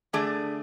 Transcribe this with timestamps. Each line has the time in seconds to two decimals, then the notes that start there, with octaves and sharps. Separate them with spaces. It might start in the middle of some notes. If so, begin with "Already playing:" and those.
0.13 D3 A3 D4 G#4 D5